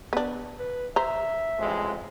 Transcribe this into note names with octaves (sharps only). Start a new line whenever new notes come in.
B3 D4
B4
C5 E5 A#5
A1 F2 G#3